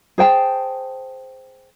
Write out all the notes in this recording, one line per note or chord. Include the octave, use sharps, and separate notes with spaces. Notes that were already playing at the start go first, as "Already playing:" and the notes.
G#4 C5 G5 A5